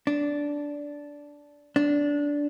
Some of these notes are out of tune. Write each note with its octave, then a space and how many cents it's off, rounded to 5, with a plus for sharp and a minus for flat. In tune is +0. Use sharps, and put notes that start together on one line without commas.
D4 -10
D4 -15